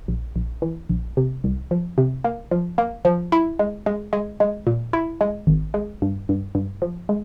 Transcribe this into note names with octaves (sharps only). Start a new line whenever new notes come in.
A#1
A#1
E3
A#1
C3
C2
F3
C3
A#3
F3
A#3
F3
E4
G#3
G#3
G#3
G#3
A#2
E4
G#3
G#1
G#3
G2
G2
G2
F3
G#3